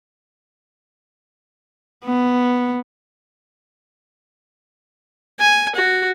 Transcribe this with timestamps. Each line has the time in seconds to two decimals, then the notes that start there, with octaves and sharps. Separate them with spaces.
2.05 B3
5.40 G#5
5.75 F#4